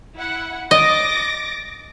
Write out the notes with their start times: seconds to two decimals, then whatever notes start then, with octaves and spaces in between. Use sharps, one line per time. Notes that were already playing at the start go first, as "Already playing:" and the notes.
0.16 E4 F#5
0.71 D#5 D6 A6 A#6